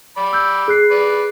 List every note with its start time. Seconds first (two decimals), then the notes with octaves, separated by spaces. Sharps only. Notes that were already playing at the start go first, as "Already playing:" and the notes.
0.17 D5 B5
0.33 E6 G6
0.68 G#4 F#6 C7
0.91 B4 D5